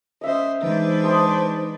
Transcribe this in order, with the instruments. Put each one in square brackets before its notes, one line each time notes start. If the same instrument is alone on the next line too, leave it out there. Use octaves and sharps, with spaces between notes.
[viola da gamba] C#4 C5 [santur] D#5 E5
[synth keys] E3 D#4 [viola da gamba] G#3 D4 B4 [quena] C5
[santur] A5 C6 D#6